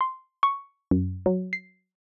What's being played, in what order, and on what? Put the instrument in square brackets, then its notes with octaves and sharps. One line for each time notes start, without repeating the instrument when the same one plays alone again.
[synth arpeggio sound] C6
C#6
F#2
F#3
C7